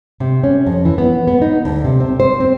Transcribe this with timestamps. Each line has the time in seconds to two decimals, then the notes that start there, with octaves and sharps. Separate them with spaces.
0.20 C3
0.44 C#4
0.66 F2
0.85 E3
0.98 B3
1.27 B3
1.42 D#4
1.65 D2
1.84 C3
2.00 C4
2.20 C5
2.40 C4